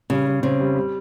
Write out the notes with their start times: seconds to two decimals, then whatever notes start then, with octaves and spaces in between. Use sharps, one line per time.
0.10 C#3 G3
0.27 G3
0.43 C#3 C4
0.60 G3
0.76 G3